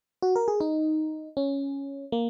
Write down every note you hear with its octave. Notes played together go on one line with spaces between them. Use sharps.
F#4
A#4
G#4
D#4
C#4
A#3